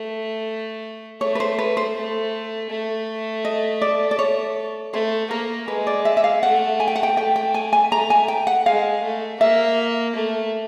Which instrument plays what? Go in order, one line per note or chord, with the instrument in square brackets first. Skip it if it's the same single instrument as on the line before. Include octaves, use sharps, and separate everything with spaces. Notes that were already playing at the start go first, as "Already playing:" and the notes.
Already playing: [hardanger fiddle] A3
[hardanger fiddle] A3 [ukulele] C#5
[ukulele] B4
C5
B4
C5
[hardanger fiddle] A3
A3
[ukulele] D#5
D5
D5
C#5
[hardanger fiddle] A3 [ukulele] C5
[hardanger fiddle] A#3 [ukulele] A#4
[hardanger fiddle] G#3 [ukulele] B4
[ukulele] D5
E5
E5
F5
[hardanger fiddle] A3 [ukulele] F#5
[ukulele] G#5
G5
F#5
G5
[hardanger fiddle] A3 [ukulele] G5
[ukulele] G5
G#5
G#5
[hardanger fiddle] A3 [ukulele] A#5
[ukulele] G#5
G5
F#5
[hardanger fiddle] G#3 [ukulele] F5
[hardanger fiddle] A3
[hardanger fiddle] A#3 [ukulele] E5
[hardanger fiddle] A3